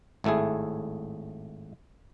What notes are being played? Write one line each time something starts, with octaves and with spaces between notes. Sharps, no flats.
G#1 A2 A3 E4 G#4